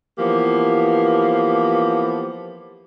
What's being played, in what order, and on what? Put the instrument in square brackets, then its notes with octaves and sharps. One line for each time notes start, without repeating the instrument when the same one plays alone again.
[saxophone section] E3 F3 A#3 B3 G4